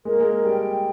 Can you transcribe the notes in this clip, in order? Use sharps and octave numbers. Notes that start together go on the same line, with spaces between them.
G#3 A#4
A#3
G#3
G3 G5